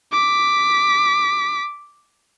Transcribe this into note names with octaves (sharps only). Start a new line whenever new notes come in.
D6 B6